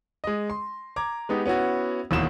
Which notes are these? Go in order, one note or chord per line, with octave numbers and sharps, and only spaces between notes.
G#3 D#5
C6
A#5 D6 G#6
G#3 B3 D#4 G4
B3 C#4 E4 F#4
E1 D#2 B2 E4 E7